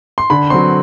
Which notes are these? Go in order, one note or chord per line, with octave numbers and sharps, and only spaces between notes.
C6
D3 B5
F#3 C4 C6